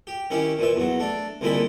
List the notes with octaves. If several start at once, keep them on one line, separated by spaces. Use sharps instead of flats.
G4
D#3 C#4 E4 G4
A#2 E3 E5
E2 F#3
A3 D4
C2 A#2 D3 G#3 E4 B5